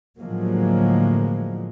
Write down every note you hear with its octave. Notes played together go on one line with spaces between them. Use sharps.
A2 D3 F3 F#3 G#3 A#3